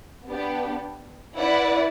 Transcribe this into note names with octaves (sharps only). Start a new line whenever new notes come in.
B3 D4 G4
E4 B4 D5 F#5